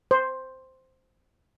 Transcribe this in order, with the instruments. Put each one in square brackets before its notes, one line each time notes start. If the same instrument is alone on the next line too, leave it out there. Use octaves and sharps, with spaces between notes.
[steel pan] C5